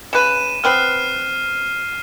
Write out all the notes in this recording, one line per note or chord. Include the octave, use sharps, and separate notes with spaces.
C#3 B4 D#7 E7
B3 C4 B4 F6 C7